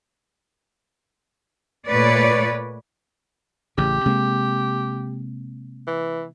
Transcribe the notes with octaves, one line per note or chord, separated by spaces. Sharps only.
A#2 A3 B4 C#5 D5
A1 C#3 G4
C3 G#3 A#3
E3